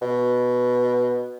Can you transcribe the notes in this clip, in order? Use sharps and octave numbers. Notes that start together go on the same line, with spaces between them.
B2